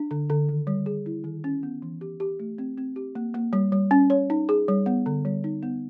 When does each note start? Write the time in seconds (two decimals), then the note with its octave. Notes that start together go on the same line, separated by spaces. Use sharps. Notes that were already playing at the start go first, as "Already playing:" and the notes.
Already playing: D4
0.11 D3
0.30 D3
0.49 D#3
0.67 G3
0.86 G#4
1.06 E4
1.24 D#3
1.44 C#4
1.63 B3
1.82 E3
2.01 G4
2.20 G4
2.40 A3
2.58 C4
2.78 C4
2.96 G4
3.15 A#3
3.34 A#3
3.53 G3
3.72 G3
3.91 C#4
4.10 C#5
4.30 D#4
4.49 G#4
4.68 G3
4.86 B3
5.06 D3
5.25 G3
5.44 D#4
5.63 B3